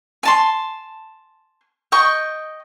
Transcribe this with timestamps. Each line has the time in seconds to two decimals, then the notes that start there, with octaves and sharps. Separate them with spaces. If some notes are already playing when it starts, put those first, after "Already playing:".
0.23 G#5 A5 C6
1.92 D#5 G5 C#6